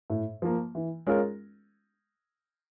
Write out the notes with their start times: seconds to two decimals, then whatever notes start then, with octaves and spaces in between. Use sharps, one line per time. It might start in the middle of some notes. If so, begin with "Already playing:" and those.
0.10 A2
0.42 F3 A#3
0.75 E3
1.07 G#3 C#4 F4 A#4